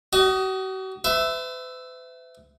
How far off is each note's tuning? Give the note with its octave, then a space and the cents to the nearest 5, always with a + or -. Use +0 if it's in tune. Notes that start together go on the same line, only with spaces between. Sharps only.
F#4 +40 D#5 +0
B4 +45 E5 +0